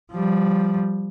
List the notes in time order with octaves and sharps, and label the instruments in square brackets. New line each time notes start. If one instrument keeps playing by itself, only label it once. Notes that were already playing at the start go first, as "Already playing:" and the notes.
[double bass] F3 G3